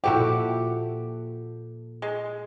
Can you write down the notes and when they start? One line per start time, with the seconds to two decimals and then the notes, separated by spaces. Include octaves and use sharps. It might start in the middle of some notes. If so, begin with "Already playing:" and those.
0.04 A#2 E4 F#4 G4 A4 F#5
2.02 G#3